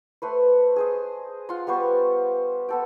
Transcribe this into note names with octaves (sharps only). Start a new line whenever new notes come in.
A3 B4 C5
G#4 C5 D#5
F4 F#5 C6
G3 B3 C5 C#6
B3 A4 G5